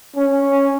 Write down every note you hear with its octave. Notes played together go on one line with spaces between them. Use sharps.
C#4